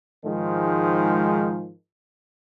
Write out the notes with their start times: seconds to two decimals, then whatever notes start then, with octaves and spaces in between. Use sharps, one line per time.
0.24 G#2 D#3 F3 G#3